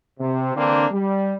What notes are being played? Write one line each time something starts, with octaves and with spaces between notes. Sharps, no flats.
C3
D3 E3 A#3 C4 D4
G3